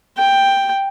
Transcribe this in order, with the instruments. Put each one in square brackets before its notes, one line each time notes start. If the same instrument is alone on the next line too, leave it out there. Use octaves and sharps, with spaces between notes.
[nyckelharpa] G5